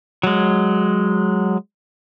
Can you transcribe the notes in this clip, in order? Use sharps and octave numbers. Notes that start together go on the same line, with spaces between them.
F#3 G#3